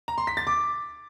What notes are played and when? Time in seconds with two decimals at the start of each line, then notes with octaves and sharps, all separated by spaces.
0.08 A#5
0.18 C6
0.27 B6
0.37 A6
0.47 D6